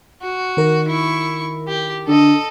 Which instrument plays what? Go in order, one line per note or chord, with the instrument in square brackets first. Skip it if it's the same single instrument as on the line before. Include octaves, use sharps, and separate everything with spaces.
[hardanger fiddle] F#4
[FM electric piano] D#3 A#4
[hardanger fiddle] E4 C#6
G4
[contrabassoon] D3 [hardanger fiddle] A4 D#5